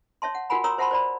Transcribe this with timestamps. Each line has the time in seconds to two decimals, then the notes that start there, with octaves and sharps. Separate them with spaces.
0.22 C#5 E5 A5 C6
0.35 F#5
0.50 F4 F#4 A#4 F#5 G#5 B5
0.64 A#4 C#5 A#5 C6 D#6 E6
0.78 C5 E5 F#5 A5 B5 C6
0.91 C5 D5 B5